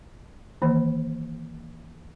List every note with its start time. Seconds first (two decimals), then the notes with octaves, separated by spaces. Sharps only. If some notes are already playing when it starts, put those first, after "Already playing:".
0.62 D#3 E3 A#3